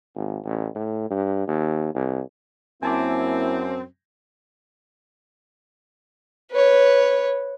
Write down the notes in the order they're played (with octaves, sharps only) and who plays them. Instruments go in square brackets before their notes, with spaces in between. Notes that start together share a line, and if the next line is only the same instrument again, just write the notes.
[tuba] G#1
A1
A2
G2
D#2
C2
[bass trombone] F#2 [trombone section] A#3 E4 [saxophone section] C4 [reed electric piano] G#5 A5 D6
[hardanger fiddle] B4 C#5